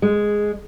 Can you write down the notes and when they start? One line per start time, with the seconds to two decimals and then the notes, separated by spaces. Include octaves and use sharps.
0.02 G#3